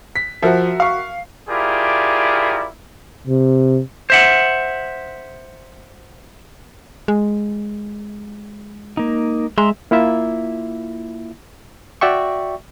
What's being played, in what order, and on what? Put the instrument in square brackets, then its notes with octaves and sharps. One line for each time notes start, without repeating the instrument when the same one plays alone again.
[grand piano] B6
[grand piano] F3 [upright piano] F#4 A#4 E5
[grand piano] F5 C#6
[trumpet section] E4 F4 G4 G#4 A#4 D5
[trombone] C3
[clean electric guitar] C5 E5 F#5
[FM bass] G#3
[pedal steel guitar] A#3 D#4
[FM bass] G#3 [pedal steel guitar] E5 A#5 C6
[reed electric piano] A#3 E4 F4 E5
F#4 D5 E5 G5 C#6